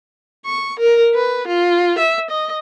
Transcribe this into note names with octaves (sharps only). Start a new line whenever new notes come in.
C#6
A#4
B4
F4
E5
D#5